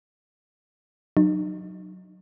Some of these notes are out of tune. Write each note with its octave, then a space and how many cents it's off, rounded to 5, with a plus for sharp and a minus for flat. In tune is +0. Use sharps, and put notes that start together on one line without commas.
F#3 +0 D#4 -35